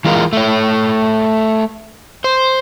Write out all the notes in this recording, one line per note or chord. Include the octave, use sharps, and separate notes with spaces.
E3 G#3 F4 A#4
A3 C#5
C5